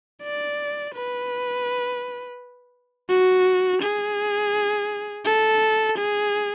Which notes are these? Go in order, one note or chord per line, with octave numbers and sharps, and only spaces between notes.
D5
B4
F#4
G#4
A4
G#4